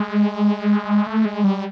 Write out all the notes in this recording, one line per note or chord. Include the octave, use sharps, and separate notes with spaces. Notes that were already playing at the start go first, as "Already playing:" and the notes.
Already playing: G#3
A3
G#3
G3